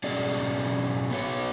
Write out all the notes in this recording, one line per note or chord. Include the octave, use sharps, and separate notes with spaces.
B2 F#3 C#4 G#4 D5
B3 F#4 C#5